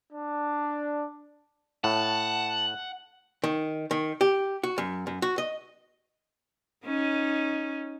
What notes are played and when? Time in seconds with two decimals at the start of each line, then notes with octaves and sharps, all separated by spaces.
0.13 D4
1.84 A2 F#5 A5
3.44 D#3
3.91 D#3
4.21 G4
4.63 F#4
4.78 F#2
5.07 F#2
5.22 F#4
5.38 D#5
6.85 C#4 D#4